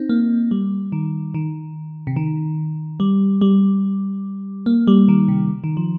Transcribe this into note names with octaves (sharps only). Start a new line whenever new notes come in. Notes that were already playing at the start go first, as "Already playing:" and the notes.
Already playing: C4 D#4
A#3
G3
D#3
D#3
C3
D#3
G3
G3
A#3
G3
D#3
C3
D#3
F3